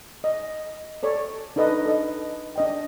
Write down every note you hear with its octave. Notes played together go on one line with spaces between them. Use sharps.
D#5
A4 C#5 D5
D4 D#4 A4 B4 D#5
A4 D#5
D4 D#5 G5